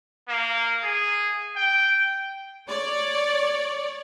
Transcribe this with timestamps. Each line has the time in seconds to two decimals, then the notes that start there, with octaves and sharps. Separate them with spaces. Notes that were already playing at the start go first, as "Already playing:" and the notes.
0.29 A#3
0.84 G#4
1.57 G5
2.68 C#5 D5